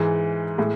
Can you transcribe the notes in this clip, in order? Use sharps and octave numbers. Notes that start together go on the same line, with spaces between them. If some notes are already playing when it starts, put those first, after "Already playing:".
Already playing: G#2 E3 G#3
A2 G#3